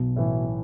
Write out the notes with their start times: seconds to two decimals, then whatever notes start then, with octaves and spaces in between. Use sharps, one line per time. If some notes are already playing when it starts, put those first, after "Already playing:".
Already playing: B1 B2
0.16 A2 E3